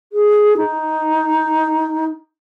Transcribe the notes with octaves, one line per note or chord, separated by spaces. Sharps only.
G#4
D#4